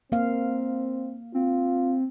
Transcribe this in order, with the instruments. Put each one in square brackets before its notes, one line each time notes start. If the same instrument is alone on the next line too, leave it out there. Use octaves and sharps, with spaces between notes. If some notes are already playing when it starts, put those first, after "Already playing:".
[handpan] A#3 F5 [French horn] C4
[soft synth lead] C4 [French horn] F4